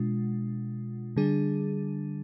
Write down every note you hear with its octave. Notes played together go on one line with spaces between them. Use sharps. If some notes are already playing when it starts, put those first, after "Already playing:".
Already playing: B2 G#3 D4 F4
D3 G3 D4 G#4